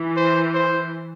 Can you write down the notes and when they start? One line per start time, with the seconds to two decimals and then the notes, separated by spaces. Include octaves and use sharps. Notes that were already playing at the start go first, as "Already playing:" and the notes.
Already playing: E3
0.17 C5
0.55 C5